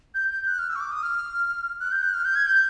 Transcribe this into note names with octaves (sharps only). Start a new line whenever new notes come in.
G6
G6
F#6
F6
E6
C#6
D6
D#6
F6
F#6
G6
F#6
F6
G6
G#6
G6